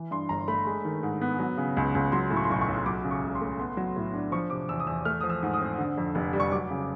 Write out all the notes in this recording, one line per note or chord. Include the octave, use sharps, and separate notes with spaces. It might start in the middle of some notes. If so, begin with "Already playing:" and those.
Already playing: E3
G2 C6
G1 A#5
A3 B5
G#3
D#3
G#2
B3
F#3
C#3
C#2
C#2
F#3 C6
A2
C#6
C6
B1 C#6
C#6
B1
F#3 D6
C#3
C#6
C#2
C6
A3
B3 C6
F#3
A2
D4
F3 C#6
C3 D6
E2 E6
D#6
E2 E6
A3 F6
F3 D#6
E6
G#2
D#6
C4
D3
F2
F1
G3
C#6
F#3 D6
C#3